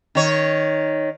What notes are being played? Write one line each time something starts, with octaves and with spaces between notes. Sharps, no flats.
D#3 C#5